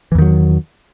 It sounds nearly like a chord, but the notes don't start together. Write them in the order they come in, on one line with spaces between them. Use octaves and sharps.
E3 E2 D#3 F#3